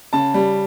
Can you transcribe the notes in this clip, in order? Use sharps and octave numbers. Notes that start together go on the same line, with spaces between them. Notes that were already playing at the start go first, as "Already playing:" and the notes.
C#3 A5
G3